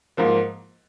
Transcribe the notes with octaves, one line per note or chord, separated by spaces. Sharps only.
G#2 F3 A#3